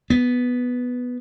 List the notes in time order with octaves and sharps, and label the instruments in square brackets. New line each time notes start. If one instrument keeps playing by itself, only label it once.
[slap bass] B3